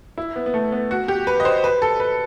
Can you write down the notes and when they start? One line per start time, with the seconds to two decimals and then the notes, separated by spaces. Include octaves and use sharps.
0.18 E4
0.36 B3
0.46 B3
0.54 A3
0.72 B3
0.91 F#4
1.08 G4
1.27 B4
1.40 D#5
1.45 C5
1.64 B4
1.82 A4
2.00 B4